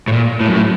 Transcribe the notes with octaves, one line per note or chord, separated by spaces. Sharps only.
A2
A#2
A2
F#2
A2